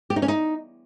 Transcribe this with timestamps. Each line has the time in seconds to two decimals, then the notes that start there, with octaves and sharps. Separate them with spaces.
0.10 G4
0.16 D#4
0.22 C#4
0.28 D#4